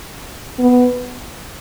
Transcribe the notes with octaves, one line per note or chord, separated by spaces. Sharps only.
B3